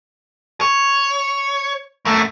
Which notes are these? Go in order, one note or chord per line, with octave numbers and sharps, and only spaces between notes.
C#5
F#2 A3